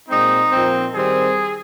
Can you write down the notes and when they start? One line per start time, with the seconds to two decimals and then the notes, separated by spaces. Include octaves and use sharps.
0.09 A#2 G#3 C4 D#4
0.52 A#2 F3 C4
0.94 D#3 G3 C4 G#4